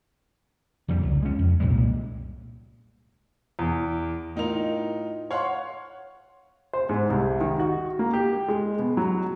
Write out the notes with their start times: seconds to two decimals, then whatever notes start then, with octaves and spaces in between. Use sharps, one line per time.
0.88 F2 D3 G3
1.03 C#2
1.23 G#3 C#4
1.38 F2
1.60 C2 A#2 G3 G#3
3.59 E2
4.36 A2 D#4 F4 A#4 F7
5.31 C#5 F5 F#5 C6 C#6
6.73 C5
6.89 G#2
7.10 C2
7.40 D#3
7.60 F#4
7.99 A#3
8.13 G4
8.48 G#3
8.79 B2
8.97 F#3